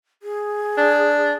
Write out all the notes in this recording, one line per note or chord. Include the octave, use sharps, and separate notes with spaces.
G#4
D4